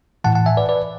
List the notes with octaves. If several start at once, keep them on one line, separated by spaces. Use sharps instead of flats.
A2 E3 F#5 A5
F#5 A5
E5 G#5
B4 D5
B4 D5